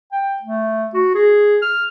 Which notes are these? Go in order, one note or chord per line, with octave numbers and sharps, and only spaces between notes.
G5
A3
F#4
G#4
F6